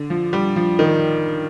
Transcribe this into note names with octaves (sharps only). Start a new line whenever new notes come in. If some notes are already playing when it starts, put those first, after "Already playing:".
Already playing: D3
F3
G3
F3
D#3